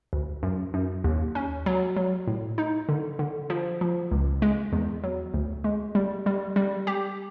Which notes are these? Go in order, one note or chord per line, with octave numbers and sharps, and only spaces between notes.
D2
F#2
F#2
D#2
C#4
F#3
F#3
A2
D#4
D3
D3
F3
F3
C#2
G#3
E2
F#3
D2
G#3
G3
G3
G3
G4